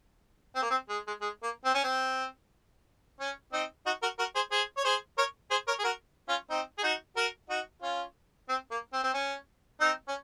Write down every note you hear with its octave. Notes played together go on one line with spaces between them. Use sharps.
C4
A#3
C4
G#3
G#3
G#3
A#3
C4
C#4
C4
C#4
C4 D#4
D#4 F#4
F#4 A#4
F#4 A#4
G#4 C5
G#4 C5
C#5
G#4 C5
A#4 C#5
G#4 C5
A#4 C#5
G#4
F#4 A#4
C#4 F4
C4 D#4
G#4
D#4 F#4
F#4 A#4
D#4 F#4
C#4 F4
C4
A#3
C4
C4
C#4
C4 D#4
C#4